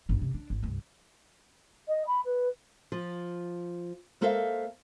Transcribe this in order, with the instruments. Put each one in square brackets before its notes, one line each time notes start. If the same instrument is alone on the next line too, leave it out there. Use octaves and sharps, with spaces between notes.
[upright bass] A1 G2
C3
D4
G#1
C2 G2
[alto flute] D#5
B5
B4
[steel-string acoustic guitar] F3
G#3 A#3 A4 C5 E5 F5